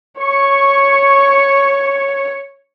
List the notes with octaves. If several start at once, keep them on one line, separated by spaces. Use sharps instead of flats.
C#5 C#6